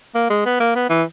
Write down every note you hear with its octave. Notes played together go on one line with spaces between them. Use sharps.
A#3
G#3
B3
A#3
B3
E3